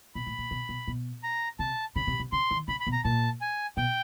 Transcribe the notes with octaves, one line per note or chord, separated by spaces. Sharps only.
B2 B5
A2
A#2
B2
B2
B2
A#5
C3 A5
C#3 B5
C3
C3
C#3 C6
D#3
C#3 B5
B5
B2
A#5
A#2 A5
G#5
B2 G5